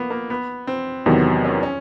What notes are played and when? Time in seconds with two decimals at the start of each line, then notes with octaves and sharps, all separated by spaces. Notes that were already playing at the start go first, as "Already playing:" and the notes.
Already playing: A#3 B3
0.10 A#3
0.30 B3
0.67 C4
1.06 E2 C3 D#3 F#3 B3
1.44 C#4
1.63 C#4